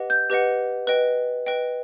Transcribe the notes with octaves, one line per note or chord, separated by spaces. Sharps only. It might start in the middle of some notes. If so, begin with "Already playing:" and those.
Already playing: G4 B4 D#5 F#5
G6
G4 B4 D#5 F#5
B4 D#5 G5
B4 D#5 G5